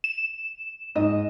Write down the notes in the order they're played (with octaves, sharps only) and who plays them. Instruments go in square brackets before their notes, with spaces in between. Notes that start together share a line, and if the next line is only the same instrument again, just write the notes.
[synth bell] E7
[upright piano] G#2 [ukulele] D#5